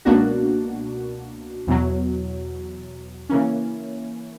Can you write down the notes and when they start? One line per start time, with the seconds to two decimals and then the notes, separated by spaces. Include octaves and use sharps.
0.05 C#2 B2 A#3 D4 F#4
1.67 E2 B2 F#3
3.29 C#3 E3 A#3 C#4